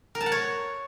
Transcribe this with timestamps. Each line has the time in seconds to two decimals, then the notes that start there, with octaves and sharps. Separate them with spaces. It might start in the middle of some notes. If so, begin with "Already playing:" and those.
0.15 A#4
0.21 A5
0.26 F#5
0.32 C#5